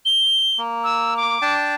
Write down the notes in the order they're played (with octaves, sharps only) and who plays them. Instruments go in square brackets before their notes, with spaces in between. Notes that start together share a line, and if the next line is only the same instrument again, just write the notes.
[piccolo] G7
[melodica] A#3
[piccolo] E6
D6
[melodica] D4 G5 A5